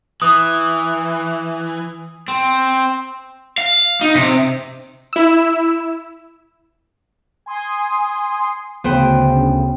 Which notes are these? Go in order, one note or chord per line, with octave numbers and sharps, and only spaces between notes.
E3 D#6
C4
F5
D#4
C3
E4 E6
G#5 C6 D#6
D2 C#3 B3 C5 G5